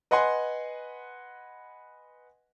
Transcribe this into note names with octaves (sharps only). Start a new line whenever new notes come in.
B4 D#5 F#5 G#5 C6